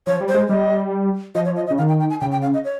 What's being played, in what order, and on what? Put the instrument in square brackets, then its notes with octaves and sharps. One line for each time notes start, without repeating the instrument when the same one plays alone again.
[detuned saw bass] F3 [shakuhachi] C#5
[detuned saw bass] G3
[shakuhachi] C5
[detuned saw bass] G#3
[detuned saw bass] G3 [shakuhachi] D#5
[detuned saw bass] F3 [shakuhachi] D#5
[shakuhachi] C#5
D#5
D#5
[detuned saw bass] C#3
[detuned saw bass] D#3 [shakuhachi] F5
[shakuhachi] G5
G5
G#5
[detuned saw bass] C#3 [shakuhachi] G5
[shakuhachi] G5
F5
D#5
C#5